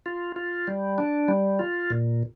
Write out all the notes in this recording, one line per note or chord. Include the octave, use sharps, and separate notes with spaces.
F4
F4
G3
D4
G3
F4
A#2